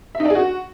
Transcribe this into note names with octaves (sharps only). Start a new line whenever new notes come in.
E5
D#4
D4
G#4
F#4